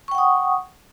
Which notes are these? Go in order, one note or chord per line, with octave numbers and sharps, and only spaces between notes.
F#5 G5 C#6 D#6